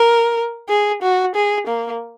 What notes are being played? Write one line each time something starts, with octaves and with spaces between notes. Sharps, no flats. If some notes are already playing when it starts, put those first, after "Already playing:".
Already playing: A#4
G#4
F#4
G#4
A#3